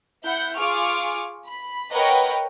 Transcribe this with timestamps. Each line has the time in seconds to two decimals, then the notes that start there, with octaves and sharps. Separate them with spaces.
0.25 E4 F#5 G6
0.58 F4 G#4 C#6 D6 F6
1.47 B5
1.92 A#4 B4 C#5 D#5 F#5 G5